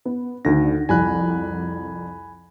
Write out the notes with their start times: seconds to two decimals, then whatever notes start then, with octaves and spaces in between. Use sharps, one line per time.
0.05 B3
0.45 D2 D3 D#3 A#6
0.89 C2 F2 G#5 B5 F#6